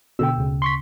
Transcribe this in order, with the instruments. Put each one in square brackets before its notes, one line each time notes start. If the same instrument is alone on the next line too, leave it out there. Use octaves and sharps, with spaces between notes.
[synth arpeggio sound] B2 D3 [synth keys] G5 E6
[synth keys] D2 C#3
[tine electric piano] C6 C#6 B6